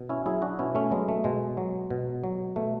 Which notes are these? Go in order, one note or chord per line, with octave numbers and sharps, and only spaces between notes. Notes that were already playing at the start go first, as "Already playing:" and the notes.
Already playing: B2
C#4 E4
F#3 E4 G#4
D4 F#4
B2 C#4 E4
A3 C#4
F#3 G#3 B3
A3
B2 G#3
F#3
B2
F#3
B2 A3